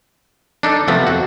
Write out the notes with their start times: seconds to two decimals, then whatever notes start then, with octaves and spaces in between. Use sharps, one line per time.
0.63 D4 D#4 A4
0.88 C3 F3 A3 B3
1.07 F2 F#4